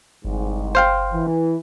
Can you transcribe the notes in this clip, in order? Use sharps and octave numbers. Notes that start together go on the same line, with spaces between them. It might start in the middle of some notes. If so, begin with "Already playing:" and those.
G1 C2 G#2
C5 F5 G5
E3